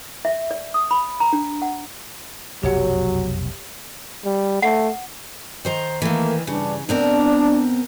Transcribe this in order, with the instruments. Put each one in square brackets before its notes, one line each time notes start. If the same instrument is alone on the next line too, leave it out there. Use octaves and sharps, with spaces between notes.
[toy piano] E5
D5
D#6
B5
A#5
D4
F#5
[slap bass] F1 B1 F#2 [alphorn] F#3 [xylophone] G4 C#5 F#5
[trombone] G3
[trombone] A3 [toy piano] F#5
[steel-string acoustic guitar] D#3 C5 A#5
[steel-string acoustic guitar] D#3 E3 [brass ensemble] A3 A#3
[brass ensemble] G2 D4 [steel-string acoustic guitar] C#3
[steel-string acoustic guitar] B2 C4 A#4 [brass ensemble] D4